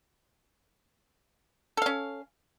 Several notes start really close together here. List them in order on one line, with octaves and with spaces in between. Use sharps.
A4 F5 C#4